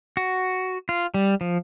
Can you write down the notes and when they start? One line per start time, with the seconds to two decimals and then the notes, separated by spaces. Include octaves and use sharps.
0.17 F#4
0.89 F4
1.14 G3
1.41 F3